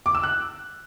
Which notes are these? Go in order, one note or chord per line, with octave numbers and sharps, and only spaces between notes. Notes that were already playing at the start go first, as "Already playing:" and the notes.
D6
E6
F#6